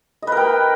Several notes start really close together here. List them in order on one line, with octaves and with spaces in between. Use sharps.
D#5 B4 A#4 G5